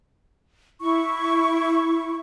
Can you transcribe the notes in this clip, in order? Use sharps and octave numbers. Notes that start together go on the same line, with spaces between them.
E4 C#6